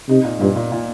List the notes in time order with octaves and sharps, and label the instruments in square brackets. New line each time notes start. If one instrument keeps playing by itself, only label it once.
[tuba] C3 [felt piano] D#4
[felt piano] A#2
[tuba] G2 [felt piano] A#2
[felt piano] A#2
A#2